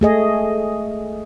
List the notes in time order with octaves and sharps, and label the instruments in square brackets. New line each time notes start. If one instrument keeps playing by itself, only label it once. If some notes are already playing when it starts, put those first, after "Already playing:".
[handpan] A3 G#4 D#5